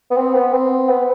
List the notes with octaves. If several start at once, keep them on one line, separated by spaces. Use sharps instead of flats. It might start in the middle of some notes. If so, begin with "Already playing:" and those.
B3
C4
B3
C4
B3